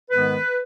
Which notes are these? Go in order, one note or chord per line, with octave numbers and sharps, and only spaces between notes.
G#2 D#3 G#3 B3 B4